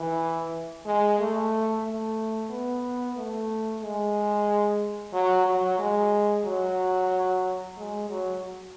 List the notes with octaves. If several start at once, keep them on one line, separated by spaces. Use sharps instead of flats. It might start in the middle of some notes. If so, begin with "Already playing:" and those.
Already playing: E3
G#3
A3
A3
B3
A3
G#3
F#3
F#3
G#3
F#3
G#3
F#3